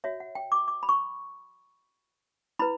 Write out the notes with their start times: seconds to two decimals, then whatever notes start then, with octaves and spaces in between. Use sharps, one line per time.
0.04 F#4 C#5 E5
0.20 F#5
0.35 G5
0.52 D6
0.68 D6
0.83 B5
0.89 C#6
2.59 E4 B4 B5